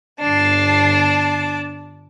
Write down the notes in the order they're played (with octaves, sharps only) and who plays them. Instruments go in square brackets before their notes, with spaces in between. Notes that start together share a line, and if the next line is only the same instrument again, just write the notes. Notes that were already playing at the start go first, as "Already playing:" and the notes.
[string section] G1 C7 [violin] D4 A5